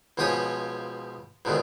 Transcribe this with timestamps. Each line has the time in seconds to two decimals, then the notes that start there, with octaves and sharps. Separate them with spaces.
0.17 C#2 B2 F3 G4 C#5 G#5
1.45 C#2 G#2 B2 D3 D#3